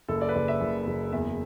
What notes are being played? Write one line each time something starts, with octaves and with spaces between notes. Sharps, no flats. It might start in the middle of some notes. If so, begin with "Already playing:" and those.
F#1 A4
D5
B4
F#1 D5
E5
F#1
F#1
E2 E5